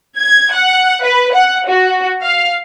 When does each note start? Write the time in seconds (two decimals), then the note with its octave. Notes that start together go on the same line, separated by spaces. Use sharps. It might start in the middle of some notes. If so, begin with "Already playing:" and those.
0.18 G#6
0.55 F#5
1.03 B4
1.34 F#5
1.67 F#4
2.22 F5